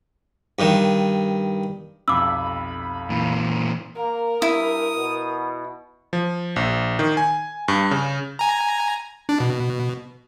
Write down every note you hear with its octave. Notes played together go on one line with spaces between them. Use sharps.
G2 D#3
B1 F2 C3 B5 D6 E6
A#2 E3
A#3 A#4
G2 E4 D#6
B2
F3
A#1
D#3
G#5
G2
C#3
G#5 A#5
D4
B2